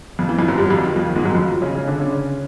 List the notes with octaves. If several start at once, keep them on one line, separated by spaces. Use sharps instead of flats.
F2 F3
E3
F2 F3
F#2 F#3
G2 G3
F#3
F2 F3
D#3
F2 F3
D#3
G#2 G#3
F#2 F#3
F2 F3
C#3 C#4
C#3 C#4
D3 D4
C#3 C#4